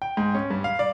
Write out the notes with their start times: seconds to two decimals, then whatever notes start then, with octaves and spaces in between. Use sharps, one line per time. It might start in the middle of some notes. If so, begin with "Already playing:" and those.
0.02 G5
0.17 G#2
0.35 C#4
0.50 G2
0.64 F5
0.79 D5